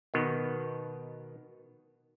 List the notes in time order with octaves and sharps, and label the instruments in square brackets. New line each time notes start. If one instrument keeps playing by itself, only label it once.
[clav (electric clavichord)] B2 D#3 B3